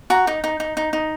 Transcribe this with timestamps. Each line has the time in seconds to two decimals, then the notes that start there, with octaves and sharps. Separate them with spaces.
0.10 F#4 A#5
0.27 D#4
0.44 D#4
0.60 D#4
0.77 D#4
0.93 D#4